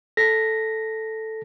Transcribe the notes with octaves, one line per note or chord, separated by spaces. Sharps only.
A4 A#6 B6